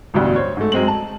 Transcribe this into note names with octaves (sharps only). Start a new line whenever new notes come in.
A1 D2 G2 B2
C5 C#5
G#2 A3
F#2 G#3 C4 F#7
A5